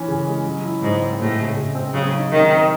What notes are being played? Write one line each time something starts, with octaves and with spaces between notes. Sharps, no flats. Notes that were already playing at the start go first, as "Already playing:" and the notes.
Already playing: E3 C#4
C#3
G#3
F#3
E4
G#2 C#3
C4
A2 G#3
C#3
C#3
C4
C#3 F#3
D#4
C3 D#3
C4